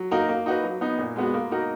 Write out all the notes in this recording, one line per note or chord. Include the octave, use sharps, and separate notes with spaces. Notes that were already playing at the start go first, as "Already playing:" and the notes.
Already playing: F#3
A#3 D#4 F#4 A#4
A#3
D#4 F#4 B4
F#3
B3 D#4
A#2
G#3 B3 F#4
A#3
D#4 F#4 A#4